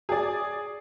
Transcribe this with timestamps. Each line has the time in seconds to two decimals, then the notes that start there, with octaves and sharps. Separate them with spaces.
0.09 G#4 D5